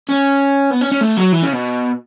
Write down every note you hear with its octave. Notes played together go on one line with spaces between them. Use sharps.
C#4
B3
C#4
C#4
A3
F#3
E3
C#3
B2